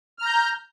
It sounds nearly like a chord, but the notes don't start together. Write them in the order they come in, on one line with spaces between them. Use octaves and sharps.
F6 A#5 G6